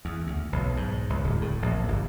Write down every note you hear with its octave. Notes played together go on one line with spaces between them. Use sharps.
E2
D2
B1
G#2
C#2
D1
A2
A#1
G1